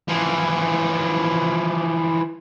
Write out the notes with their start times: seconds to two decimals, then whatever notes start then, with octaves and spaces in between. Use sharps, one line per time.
0.08 E3 F3